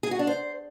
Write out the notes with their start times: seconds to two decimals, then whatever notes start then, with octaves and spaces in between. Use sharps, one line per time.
0.03 G#4
0.11 F#4
0.19 D4
0.27 C5